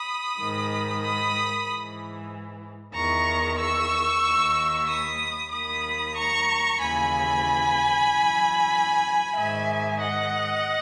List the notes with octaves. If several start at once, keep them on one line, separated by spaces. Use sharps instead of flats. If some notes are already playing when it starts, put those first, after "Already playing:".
Already playing: B5 D#6
G#2 D#3
B5 D#6
G#2 E3
E2 D#3 A#5 C#6
C#6 E6
D#2 D#3
B5 D#6
D#2 D#3 B5 D#6
A#5 C#6
D#2 C#3 E3 G#5 B5
F#2 E3
G#2 D#3 E5 G#5
D#5 F#5